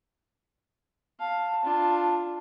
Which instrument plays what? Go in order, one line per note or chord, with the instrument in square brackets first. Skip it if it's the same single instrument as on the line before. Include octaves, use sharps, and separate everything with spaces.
[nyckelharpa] F5 [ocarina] A5
[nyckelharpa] D4 F4